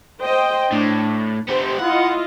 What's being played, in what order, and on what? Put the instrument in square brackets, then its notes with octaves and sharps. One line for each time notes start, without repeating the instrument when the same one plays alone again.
[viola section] C5 D#5 G5
[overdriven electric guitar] A2 [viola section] D4
[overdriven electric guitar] B3 G4 [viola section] C5
[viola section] E4 F4 D#5 [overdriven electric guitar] F#5